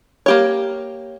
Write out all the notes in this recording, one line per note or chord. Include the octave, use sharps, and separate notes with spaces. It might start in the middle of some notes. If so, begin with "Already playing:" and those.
A#3 G4 C#5